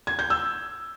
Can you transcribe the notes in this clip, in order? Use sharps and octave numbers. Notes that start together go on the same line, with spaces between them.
G#6
G6
E6